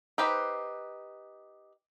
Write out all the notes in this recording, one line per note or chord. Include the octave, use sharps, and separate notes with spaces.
D#4 G4 B4 C5